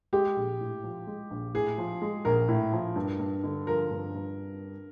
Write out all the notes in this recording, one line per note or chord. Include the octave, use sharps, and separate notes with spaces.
G#3 G4
A#1
A2
F3
G#3
A#1
A2 G#4
F3
G#3
A#1 A#4
A2
F3
G2
G2
D3
F3 A#4
G2
G2